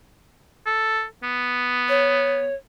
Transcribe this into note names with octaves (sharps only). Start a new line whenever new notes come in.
A4
B3
C#5